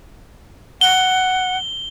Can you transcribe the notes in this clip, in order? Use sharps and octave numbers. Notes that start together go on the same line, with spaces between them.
F#5 G7